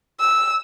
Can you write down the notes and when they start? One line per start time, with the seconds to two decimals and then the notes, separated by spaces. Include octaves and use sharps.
0.20 E6